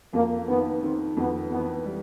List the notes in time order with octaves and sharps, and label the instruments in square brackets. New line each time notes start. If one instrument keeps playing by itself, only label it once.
[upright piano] F2 [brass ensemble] A#3
[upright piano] D#3 [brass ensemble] B3
[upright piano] D#3 [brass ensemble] C4
[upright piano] F2 [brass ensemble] B3
[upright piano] E3 [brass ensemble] B3
[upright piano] G3